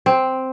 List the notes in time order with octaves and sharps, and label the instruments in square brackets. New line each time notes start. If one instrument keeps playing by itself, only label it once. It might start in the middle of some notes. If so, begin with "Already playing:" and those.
[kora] C4